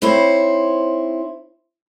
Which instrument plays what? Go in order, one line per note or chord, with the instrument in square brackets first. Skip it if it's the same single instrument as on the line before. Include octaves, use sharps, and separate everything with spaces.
[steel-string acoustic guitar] C4 D#4 E4 C5 C#5